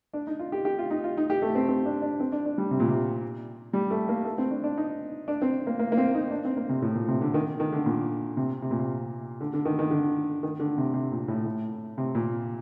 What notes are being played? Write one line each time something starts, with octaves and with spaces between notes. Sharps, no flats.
D4
D#4
F4
G4
G4
F4
D#4
F4
D#4
G4
A3
C4
C4
D4
D4
C4
D4
D4
G3
C3
A#2
C3
G3
A3
A#3
A3
C4
D4
D4
D#4
D4
C4
A#3
A#3
A#3
C4
D#4
D4
C4
A#3
C3
A2
A#2
C3
D3
D#3
D#3
D3
A#2
C3
C3
A#2
C3
D3
D3
D#3
D#3
D3
D#3
D3
C3
C3
A#2
A2
A2
C3
A#2